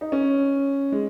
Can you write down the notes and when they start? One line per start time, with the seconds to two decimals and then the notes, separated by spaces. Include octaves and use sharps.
0.01 D#4
0.12 C#4
0.92 G#3